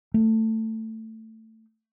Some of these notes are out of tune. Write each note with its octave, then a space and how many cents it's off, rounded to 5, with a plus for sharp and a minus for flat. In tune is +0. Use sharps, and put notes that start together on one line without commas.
A3 +15